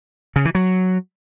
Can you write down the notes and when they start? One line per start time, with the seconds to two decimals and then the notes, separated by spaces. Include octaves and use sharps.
0.36 C#3
0.45 E3
0.55 F#3